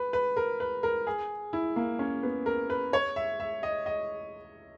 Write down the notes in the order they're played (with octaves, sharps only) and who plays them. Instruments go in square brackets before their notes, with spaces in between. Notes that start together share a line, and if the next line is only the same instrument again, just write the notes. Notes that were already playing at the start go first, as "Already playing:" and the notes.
Already playing: [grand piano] B4
B4
A#4
B4
A#4
G#4
E4
A#3
C#4
B3
A#4
B4
C#5
E5
E5
D#5
D#5